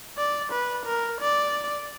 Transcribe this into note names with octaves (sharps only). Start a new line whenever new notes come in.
D5
B4
A#4
D5